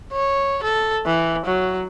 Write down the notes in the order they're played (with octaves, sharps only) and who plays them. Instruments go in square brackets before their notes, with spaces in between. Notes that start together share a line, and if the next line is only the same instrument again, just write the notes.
[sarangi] C#5
A4
E3
F#3